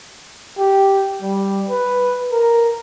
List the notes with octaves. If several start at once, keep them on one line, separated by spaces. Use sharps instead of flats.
G4
G3
B4
A#4